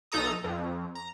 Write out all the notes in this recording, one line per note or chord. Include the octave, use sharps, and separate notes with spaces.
B1 D#4 A4 A#5 D#6
F2
A#5